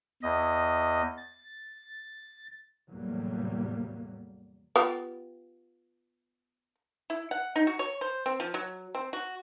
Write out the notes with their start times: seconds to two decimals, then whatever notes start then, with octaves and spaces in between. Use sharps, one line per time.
0.23 E2 D#5
1.17 A6
2.90 E2 A2 C3 F#3 G3 A#3
4.76 B3 F4 G4
7.10 E4
7.31 F#5
7.56 D#4
7.67 F#4
7.79 C#5
8.01 C5
8.26 C4
8.40 F3
8.54 F#3
8.95 C4
9.13 F#4